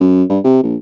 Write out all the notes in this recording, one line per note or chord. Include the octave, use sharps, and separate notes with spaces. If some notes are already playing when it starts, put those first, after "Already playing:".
F#2
G2
C3
A#1